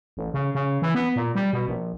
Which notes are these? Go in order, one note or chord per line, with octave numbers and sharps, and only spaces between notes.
A1
C#3
C#3
E3
B3
A#2
G3
B2
A#1